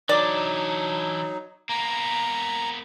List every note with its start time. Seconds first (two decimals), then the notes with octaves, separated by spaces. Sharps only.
0.09 E3 F#3 D4 D#4 D5
1.69 A#3 B3 A#5